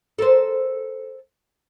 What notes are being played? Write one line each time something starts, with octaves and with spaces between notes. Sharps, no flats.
A4 A#4 C5